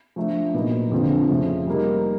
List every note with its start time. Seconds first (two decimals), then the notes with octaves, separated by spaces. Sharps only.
0.16 F3 A3 D4
0.54 A#2 F#3 B3 D#4
0.91 F2 D3 F3
1.29 C#3 F3 A3
1.67 G3 A#3 D#4